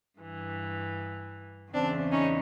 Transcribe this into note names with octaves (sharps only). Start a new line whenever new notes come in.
G2 E3
E2 C#3 E3 C4 D4
C#4 D#4